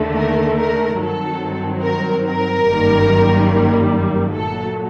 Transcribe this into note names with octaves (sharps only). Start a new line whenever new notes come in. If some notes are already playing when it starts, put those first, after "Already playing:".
Already playing: D#2 D3 A3
A#4
A#4
G2 D#3 F#3 C4 A4
A#4
A#4
G1 F#2 D#3 G3 A#3
A#2 F#3 A3 A4